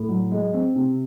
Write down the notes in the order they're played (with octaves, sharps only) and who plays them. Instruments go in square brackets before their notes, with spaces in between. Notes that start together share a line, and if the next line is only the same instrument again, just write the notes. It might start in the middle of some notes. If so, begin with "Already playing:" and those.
Already playing: [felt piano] A2
F#3
G#3
C4
C3